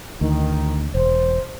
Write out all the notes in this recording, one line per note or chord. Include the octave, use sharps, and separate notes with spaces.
D2 D#3
E1 C5